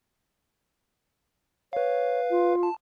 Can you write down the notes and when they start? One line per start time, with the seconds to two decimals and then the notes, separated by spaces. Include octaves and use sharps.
1.73 B4 C#5 F5
2.30 F4
2.63 A5